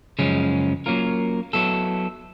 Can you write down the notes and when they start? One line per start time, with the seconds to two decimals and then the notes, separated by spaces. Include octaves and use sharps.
0.19 F#2 C#3 F3 G#3 C#4
0.86 F#3 A#3 C#4 F4 A#4
1.53 F#3 B3 E4 A4